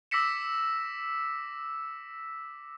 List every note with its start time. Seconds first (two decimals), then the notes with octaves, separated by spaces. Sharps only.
0.11 D6 E6 A#6 B6 C#7 E7